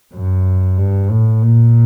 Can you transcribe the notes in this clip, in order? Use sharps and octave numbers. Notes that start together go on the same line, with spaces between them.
F#2
G2
A2
A#2